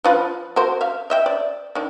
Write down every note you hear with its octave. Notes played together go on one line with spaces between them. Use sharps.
F3 F4 B4
F#4 A#4 C5
E5 F5
D#5 E5 G5
D5
D#3 D4